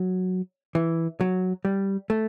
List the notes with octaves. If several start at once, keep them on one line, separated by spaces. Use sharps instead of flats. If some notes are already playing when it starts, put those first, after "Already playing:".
Already playing: F#3
E3
F#3
G3
A3